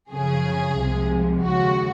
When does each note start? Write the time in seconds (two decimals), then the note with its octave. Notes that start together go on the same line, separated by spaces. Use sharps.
0.12 F#2 C#3 F3 G#4
0.78 C2 C3 F3 G#3
1.44 D#2 C#3 G#3 F#4